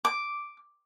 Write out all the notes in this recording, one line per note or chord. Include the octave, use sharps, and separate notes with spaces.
D6